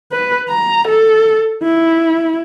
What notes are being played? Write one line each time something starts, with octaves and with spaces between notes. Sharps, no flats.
B4
A#5
A4
E4